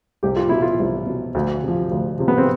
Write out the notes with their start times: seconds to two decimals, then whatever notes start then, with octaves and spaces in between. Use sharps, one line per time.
0.23 C2 G4
0.36 F4
0.49 B2 E4
0.62 F4
0.80 C2
1.06 B2
1.35 D2
1.63 C3 F3
1.91 D2
2.19 C3 F3
2.28 B3
2.38 C4